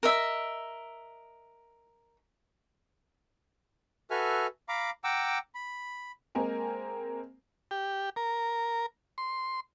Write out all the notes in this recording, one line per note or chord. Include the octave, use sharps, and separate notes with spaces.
A#4 D#5 E5
F#4 A4 B4 E5 G#5 F6
F5 A#5 B5 D6
F#5 G5 A#5 D6 E6
B5
G#3 A#3 C4 A#4 G#5
G4
A#4
C6